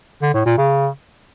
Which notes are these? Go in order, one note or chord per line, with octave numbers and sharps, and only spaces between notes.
D3
A2
A#2
C#3